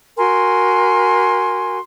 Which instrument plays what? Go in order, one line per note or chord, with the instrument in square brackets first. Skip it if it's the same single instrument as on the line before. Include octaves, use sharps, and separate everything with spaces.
[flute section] F#4 A#4 G#5 C6